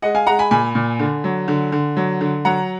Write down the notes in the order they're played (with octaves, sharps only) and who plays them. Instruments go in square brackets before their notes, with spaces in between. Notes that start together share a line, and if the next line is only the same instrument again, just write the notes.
[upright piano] G#3 D#5 F#5
F5 G#5
G#3 F#5 A#5
G#5 B5
A#2 G#5 B5
A#2
D3
F#3
D3
D3
F#3
D3
F#3 F#5 A#5